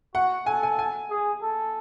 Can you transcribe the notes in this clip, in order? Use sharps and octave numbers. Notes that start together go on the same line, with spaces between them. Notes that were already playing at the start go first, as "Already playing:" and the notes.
F#4 F#5
A4 G#5
G#5
G#5
G#4
A4